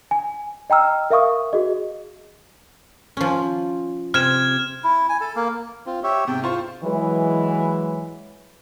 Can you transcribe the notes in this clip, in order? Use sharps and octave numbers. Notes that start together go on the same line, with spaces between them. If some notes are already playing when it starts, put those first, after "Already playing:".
G#5
D#5 G5 A#5 E6 F6
A#4 E5 F5 C#6 D#6
F#4 G#4 D#5
F3 C#4
C3 F6 G#6 E7
E4
G#5
A4
A#3
C4 F4
G4 C#5 E5
G#2 C3 G5
F4 C5 C#6
E3 F#3 G#3